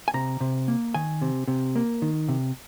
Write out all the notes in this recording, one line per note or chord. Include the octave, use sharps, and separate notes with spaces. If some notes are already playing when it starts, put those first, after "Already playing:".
G#5
C3 A#5
C3
A#3
D#3 G#5
C3
C3
A#3
D#3
C3